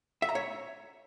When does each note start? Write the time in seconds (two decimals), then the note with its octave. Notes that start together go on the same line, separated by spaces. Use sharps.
0.22 E5
0.29 A#5
0.35 C#5